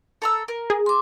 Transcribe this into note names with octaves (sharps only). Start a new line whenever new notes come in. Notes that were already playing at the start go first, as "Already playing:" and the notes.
A4 A#5 E6
A#4
G#4
C6 D6